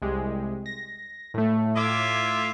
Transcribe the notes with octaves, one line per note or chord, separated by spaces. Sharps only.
C2 G#3 G4
A#6
A2 A3
A2 F4 E5 D6 G#6